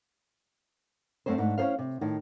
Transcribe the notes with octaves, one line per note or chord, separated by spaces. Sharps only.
F#2 A3 C4 C5
G#2 A3 D4
C#4 E4 G#4 C5 F5
C3
A2 D#3